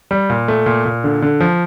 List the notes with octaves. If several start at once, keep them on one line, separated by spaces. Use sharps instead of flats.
G3
A#2
A3
A#2
A#2
D3
D3
F3